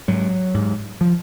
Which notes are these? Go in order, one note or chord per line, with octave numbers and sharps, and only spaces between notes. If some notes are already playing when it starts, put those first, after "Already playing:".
G#2 F#3
G#2
F3